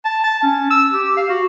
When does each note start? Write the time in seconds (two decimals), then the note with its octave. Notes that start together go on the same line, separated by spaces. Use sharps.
0.05 A5
0.24 A5
0.43 C#4
0.70 E6
0.92 G4
1.17 F5
1.29 F#4